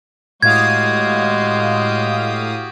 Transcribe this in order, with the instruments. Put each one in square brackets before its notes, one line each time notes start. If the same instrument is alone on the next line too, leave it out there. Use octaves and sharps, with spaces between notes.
[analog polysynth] A2 F5 D#6 [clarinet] G#3 [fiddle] F#4 G4 [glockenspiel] G#6